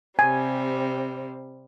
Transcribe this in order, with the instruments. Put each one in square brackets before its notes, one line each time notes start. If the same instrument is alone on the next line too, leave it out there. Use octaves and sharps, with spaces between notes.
[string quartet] C3 G3 C4 [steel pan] G#5